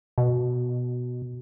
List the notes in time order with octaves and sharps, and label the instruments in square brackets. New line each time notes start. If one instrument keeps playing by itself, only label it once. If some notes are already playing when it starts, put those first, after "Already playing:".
[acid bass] B2